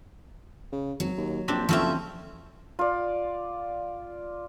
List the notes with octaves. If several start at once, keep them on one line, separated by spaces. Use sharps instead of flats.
C#3
G#1 F#3
D#2
A#1 C4 D4 G4
F#1 F3 A3 C4 C#4 A4 E5
F4 D5